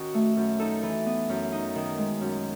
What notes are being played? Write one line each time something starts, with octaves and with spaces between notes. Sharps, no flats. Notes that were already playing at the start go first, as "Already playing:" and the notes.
Already playing: D#3 C#4 F#4
A3
F#2
D#4 A4
E3
B3
F#2
D#4
D#3
G#3
F#2